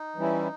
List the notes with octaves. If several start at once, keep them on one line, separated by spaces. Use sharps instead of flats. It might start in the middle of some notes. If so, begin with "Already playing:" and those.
Already playing: D#4
E3 G3 C#4 E4